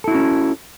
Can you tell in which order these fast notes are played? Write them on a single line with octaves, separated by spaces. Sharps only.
A4 E4 F#4 C#4